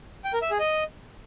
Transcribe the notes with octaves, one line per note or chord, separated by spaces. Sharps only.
G5
A#4
E5
G#4
D#5